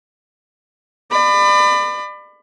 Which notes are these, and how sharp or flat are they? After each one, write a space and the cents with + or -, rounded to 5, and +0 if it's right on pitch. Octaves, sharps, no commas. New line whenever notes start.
D5 +35 B5 +25